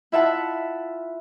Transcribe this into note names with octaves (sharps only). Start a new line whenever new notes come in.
E4 F4 E5 F#5 A5